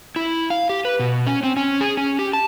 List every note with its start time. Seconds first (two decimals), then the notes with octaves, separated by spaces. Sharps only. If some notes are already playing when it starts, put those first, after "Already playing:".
0.16 E4
0.50 F5
0.70 G4
0.85 B4
0.99 B2
1.27 C#4
1.43 C4
1.57 C#4
1.81 G#4
1.97 C#4
2.19 G4
2.33 A5